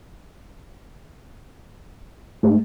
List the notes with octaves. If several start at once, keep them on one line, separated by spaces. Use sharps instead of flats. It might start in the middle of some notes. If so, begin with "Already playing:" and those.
G#2 A3